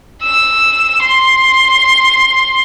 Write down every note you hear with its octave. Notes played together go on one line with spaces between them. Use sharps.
E6
C6